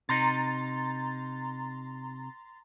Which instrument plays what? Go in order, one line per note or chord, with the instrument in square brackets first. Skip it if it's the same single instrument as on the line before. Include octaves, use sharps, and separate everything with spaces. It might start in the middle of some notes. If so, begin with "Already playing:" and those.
[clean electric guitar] C3 D#4 [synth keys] A#5 C6 A6